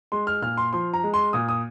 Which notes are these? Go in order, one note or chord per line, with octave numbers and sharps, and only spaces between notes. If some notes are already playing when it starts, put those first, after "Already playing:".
G#3 C6
F6
A#2 F6
C6
F3 C6
A#5
G#3
C6
A#2 D#6
D#6